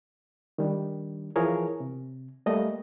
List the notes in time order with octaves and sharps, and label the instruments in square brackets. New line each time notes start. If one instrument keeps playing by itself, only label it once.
[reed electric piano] D#3 G3 D4
E3 F3 G#4 A#4 C#5
C3
G3 A3 A#3 D#5